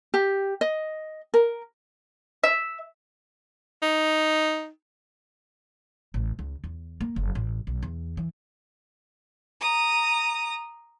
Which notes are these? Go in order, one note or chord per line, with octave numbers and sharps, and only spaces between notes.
G4
D#5
A#4
E5
D#4
A1
C#2
E2
A#3
F#1
A1
B1
E2
E3
A#5 D#6